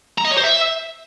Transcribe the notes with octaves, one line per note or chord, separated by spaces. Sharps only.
A#5
D#5
C#5
C5
E5